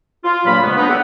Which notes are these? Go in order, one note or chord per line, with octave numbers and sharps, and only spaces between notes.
F4
G2 A#2 F#3 A#3 B5
F2 C#3 G#3 A3 B3
B3 D4 D#4 B4
G4 A4 C#5 E5 F#5